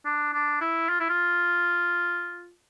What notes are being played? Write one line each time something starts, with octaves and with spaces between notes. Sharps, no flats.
D4
D4
E4
F4
E4
F4